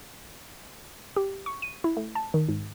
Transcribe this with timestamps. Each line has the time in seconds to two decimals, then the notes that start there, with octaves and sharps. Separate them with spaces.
1.16 G4
1.46 C#6
1.62 D#7
1.84 E4
1.97 A3
2.15 A5
2.34 D#3
2.49 G#2